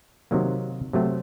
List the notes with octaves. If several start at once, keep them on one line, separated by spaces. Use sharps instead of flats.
C3 D#3 F#3 A#3
C3 F#3 A3 C4